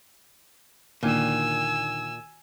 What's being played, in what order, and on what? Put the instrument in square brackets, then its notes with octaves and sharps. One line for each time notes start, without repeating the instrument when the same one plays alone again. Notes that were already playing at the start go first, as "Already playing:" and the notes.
[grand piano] D2 D#3 D4 [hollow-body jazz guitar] A#2 [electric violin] G#5 E6